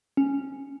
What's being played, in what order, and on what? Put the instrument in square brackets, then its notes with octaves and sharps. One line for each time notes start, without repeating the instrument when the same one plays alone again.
[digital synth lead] C#4